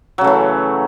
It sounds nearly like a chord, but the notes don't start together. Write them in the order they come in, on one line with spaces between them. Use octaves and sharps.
F#3 C#3 A3 E3